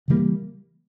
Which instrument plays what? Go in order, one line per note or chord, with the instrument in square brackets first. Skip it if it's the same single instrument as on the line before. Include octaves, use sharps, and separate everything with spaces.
[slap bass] C#3 E3 G3 A#3